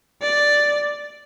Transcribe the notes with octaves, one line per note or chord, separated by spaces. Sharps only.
D5